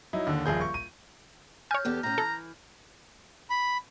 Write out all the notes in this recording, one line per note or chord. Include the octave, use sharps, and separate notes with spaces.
F#3 D#4 E4
D#2 D3
D#1 A#1 G#4 G6
C#6
D#7
C#5 G#5 F6 G6
E2 B3 G4 A4
A2 C#4 A#5
E3 A4
B5